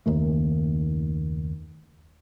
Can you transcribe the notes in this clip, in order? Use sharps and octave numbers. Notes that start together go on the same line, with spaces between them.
F#1 D#2 D#3 A3